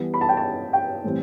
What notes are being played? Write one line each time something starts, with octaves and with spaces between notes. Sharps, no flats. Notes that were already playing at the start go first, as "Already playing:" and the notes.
Already playing: E3 G3 B3
B5
A5
G5
A5
G5
A2 E3 G3 C4